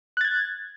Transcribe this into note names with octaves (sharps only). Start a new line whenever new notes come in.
F#6 G#6 A6